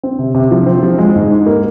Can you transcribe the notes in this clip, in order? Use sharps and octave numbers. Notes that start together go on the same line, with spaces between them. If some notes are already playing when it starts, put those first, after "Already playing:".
C4
C3
C3
F3
C4
F3
G#3
G#2
D#4
A#3